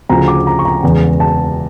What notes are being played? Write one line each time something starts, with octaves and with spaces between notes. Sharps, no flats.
D2 C#3 F3 A#5
D6
A#5
C#6
A#5
E1 E2 C#3
A5